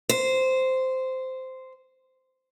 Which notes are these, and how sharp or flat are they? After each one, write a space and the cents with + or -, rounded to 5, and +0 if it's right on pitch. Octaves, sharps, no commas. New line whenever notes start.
C5 -10